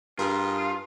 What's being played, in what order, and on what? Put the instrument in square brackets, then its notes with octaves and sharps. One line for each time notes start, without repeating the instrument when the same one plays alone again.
[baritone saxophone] G2 [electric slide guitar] F4 [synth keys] G#4 A#4